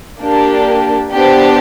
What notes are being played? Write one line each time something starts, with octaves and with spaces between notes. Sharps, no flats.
A#3 D4 G4
B3 D4 G4 C5